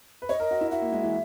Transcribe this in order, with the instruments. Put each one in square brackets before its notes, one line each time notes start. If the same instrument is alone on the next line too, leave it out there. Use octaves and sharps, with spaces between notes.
[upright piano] B4
[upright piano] C#5 [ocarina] D#5
[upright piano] A#4
F#4
E4
[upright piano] F#4 [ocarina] E5
[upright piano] A#3
G#3
E3